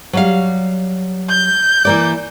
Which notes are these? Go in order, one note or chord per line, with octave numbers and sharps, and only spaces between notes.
F#3 G3 F5
G6
E3 A#3 D5